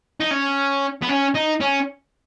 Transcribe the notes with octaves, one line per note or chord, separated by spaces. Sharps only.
D#4
C#4
B3
C#4
D#4
C#4